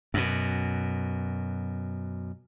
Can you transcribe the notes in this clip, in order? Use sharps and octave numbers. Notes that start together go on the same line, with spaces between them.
F#2 B2